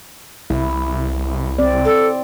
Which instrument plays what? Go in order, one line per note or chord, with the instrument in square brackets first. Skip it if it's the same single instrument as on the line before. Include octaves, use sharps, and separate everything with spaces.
[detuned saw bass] C2 [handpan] E4
[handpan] C4 D5
[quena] A4